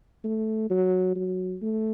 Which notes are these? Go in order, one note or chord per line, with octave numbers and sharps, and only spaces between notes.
A3
F#3
F#3
A3